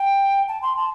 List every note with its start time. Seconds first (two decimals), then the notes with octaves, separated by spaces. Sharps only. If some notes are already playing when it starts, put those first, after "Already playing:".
Already playing: G5
0.48 A5
0.62 C6
0.76 A5